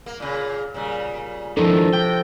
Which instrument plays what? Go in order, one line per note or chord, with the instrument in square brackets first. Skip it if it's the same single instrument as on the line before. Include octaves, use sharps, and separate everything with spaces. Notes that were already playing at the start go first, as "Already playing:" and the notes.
[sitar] A#3
A#2 C#3
A#2 C#3 G3
[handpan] F3 A4 [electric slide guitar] D4 E4 A#4
[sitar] C3 [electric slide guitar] G5